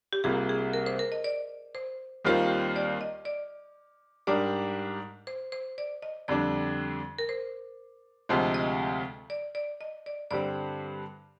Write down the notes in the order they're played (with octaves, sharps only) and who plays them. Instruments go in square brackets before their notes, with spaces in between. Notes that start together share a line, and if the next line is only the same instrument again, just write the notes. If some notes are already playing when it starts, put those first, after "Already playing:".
[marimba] G4
[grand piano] C2 C3 G3 A#3 F4 [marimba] G#4
[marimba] G#4
A#4
C5
A#4
D#5
D5
C5
[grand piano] D#2 D#3 G3 C4 F4
[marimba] D5
D#5
D5
[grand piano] G#2 G3 D4 G4 A#4 [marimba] D5
[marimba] C5
C5
D5
D#5
[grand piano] F2 D3 G3 D4 [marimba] D5
[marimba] A#4
C5
[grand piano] D2 C3 F3 G#3
[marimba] D#5
D5
D5
D#5
D5
[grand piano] G2 D3 G3 C4 [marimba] D5